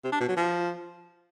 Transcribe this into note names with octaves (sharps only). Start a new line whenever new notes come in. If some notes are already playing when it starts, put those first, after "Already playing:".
C3
D4
B2
F#3
F3